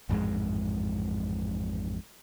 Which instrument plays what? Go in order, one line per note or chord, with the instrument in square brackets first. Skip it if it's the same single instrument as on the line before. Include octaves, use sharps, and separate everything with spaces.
[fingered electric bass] A1 F2 G#2 G#3